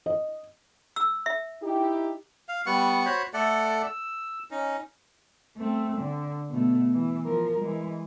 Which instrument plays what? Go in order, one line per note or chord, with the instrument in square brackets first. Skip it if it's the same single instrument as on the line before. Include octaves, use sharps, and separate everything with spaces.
[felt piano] D#5
[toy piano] E6
E5
[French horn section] D#4 E4 G4
[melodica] F5
G3 B3 F#5 C#6
F#4 C5 C#5 B5
A3 A4 D5 F#5
E6
C#4 D#4
[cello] A3 C4
D3
B2 A3
E3
F3 A#4
E3 G#3